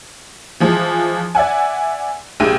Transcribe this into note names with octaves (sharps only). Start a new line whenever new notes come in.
E3 F3 G#3
D5 E5 F#5 G#5
A#1 C3 G#3 E5 G5 D#7